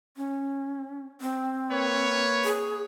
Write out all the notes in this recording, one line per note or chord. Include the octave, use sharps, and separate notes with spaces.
C#4
C4
A#3 B4 C#5
G#4